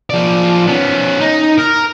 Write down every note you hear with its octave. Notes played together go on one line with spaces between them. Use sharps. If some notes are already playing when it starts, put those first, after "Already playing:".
F3 D5
B3 C#4
D#4
A#4